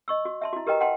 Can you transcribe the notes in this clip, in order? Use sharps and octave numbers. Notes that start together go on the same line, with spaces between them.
D#5 C#6 E6
F#4
E5 A5 C6
E4 F#4
G4 A#4 B4 D#5 G5 A#5
D#5 F#5 G5 A5 C6